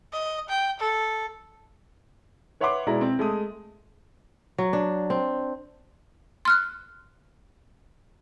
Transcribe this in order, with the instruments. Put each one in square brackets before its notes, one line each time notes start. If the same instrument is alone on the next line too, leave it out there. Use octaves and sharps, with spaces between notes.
[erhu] D#5
G5
A4
[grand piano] B4 C#5 E5 F#5 C6 D6
B2 G#3 E4 D5 A#5
C4
G#3 A3 D#6
[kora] F#3
D4
C4
[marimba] C6 F6 F#6